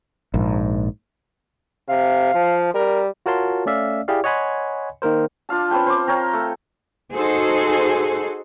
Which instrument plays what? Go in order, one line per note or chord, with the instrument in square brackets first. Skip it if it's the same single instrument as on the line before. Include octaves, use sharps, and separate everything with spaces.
[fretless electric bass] A#1 G#2
[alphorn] C3 [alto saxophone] F5
[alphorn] F3
[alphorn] G3 [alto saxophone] A#4
[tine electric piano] F4 F#4 A#4 C#5 A5 C6
A3 C#4 D5 E5 F5
E4 G4 G#4 D5 F5
C#5 D#5 F#5 G#5 B5 C6
D#3 A#3 A#4 C5
[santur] D4 F4 F5 A5
C4 C#4 B4 G5
C5 D6
C4 A#4 C#5 G5
A3
[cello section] D#4 F#4 G#4 A4 C5